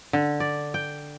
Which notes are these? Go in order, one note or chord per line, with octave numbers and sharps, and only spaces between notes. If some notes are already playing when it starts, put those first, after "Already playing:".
D3
D5
G5